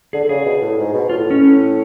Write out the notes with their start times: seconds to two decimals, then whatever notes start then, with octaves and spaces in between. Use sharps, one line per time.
0.13 D3 G#4
0.24 D3
0.29 C#3 G#4
0.45 B2
0.62 A2
0.78 G#2
0.94 B2
1.09 A2 F4
1.30 C#4
1.41 A2